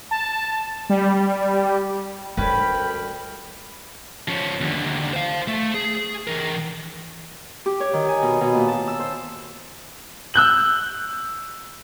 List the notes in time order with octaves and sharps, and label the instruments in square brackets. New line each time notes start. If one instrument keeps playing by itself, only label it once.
[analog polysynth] A5
G3
[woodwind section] D2 A#4 B5 [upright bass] G3 [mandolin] C#4 B4 [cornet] G5
[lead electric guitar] F3 C#4
D#2 D3
C5 F5
A3
G#4
E3 A#4
[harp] G4
C#5
D#3
G#5
B2
B2
A#2
A5
E6
C5
[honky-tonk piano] E6 F#6 G6 F#7